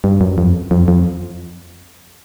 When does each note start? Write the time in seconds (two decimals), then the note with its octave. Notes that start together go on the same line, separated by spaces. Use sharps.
0.04 G2
0.21 F#2
0.38 F2
0.71 F2
0.88 F2